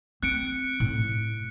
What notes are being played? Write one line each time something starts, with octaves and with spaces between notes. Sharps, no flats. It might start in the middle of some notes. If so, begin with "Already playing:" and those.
C4 F#6 C#7 D7
A2